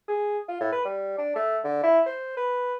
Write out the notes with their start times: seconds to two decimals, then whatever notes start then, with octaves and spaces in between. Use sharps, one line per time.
0.08 G#4
0.49 F4
0.61 A2
0.72 B4
0.85 G3
1.18 D4
1.36 A3
1.64 D3
1.83 E4
2.06 C5
2.37 B4